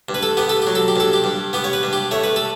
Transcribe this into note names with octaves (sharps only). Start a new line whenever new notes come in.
G2
B4
A4
B3 G4
A4
F#3 G4
A4
G4
G2 A4
G4
G2
B3 G4
C#5
B4
G2
G4
A3 C#5
B4
A4